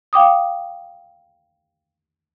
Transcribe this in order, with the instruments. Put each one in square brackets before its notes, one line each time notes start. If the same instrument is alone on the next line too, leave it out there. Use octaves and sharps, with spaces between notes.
[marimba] F5 G5 D6 D#6